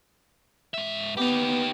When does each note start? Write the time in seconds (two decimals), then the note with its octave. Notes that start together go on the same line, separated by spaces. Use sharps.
0.74 G#2 E5
1.17 B3 D#4 G4